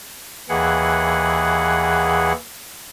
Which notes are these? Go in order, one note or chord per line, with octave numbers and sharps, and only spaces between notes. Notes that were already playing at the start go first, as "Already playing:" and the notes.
D#2 E3 G#4 F#5